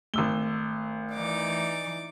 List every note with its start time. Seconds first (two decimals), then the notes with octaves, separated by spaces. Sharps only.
0.14 G#1 A3 E6 G7
1.14 E3 D#4 D5 D6